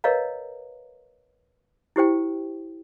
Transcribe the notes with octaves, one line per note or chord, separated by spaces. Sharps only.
A#4 B4 C#5 D#5 F5 A#5
E4 G4 C5 G5